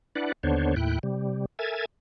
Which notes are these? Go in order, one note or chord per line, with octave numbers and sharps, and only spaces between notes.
D4 E4 B4 D5 F#5
D#2 D3 B3 D4 C5 C#5
D#2 A2 E4 G5 F#6
C3 G3
A4 A#4 E5 G#5 G#6 A6